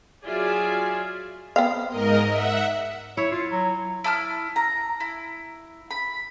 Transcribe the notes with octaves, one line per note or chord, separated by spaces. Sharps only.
F#3 F4 G#4 D5 E5 G#5
B3 C4 F5
G#2 A#4 D#5
E5 F#5
E4 C#5
F4
F#3
E4 A5 D#6 F6
A#5
E4
B5